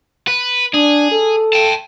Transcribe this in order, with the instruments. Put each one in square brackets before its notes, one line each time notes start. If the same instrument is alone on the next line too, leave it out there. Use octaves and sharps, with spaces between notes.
[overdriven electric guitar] B4
[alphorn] D4 [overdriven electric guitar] G#4
[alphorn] A4
[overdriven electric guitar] G5 A5